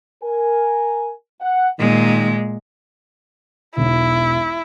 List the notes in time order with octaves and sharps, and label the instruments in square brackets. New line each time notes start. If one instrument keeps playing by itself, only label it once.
[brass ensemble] A#4 G#5
F#5
[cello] A#2 G#3 [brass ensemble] D#3
[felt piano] E1 B1 [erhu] E4